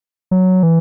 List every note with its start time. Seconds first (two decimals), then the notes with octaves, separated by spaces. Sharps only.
0.31 F#3
0.63 E3